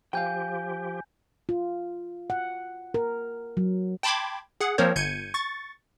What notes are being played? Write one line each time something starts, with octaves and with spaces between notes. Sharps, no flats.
F3 G4 F5 G5 G#5 G6
F4
F#5
A#4
F#3
G5 A5 B5 C6 D6 G#6
G#4 F#5
F3 A#3 C4 A#4 C5 C#5
G1 G6 G#6 C#7 D#7
C#6 A6